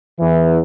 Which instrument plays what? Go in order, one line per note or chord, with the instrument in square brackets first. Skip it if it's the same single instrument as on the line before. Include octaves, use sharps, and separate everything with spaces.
[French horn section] E2 E3